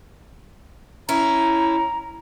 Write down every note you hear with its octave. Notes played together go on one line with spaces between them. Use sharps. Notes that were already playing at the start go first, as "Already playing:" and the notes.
C#4 E4 A#5